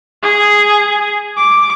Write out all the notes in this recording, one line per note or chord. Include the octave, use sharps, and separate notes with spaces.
G#4
D6